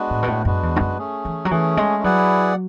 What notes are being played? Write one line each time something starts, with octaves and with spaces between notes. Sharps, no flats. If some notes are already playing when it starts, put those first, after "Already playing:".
Already playing: G#3 B3 D4 F#4 B4
A2
B2
A2
F#2 G#3 B3 D4 F#4 B4
E2
G#2
F#2
A3 C#4 G#4
E3
F#3
E3 A3 C#4 G#4
G#3
F#3 E4 G#4 B4 D5 F#5